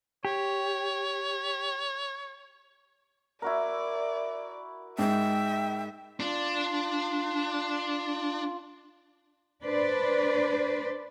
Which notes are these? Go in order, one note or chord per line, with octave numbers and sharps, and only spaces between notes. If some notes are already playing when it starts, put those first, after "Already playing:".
G4 C#5
E4 F#4 A#4 D5
G#2 E5 G5
D4 F4
D4 B4 C5 D5